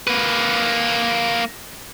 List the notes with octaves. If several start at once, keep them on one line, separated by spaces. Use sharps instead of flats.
A#3 B4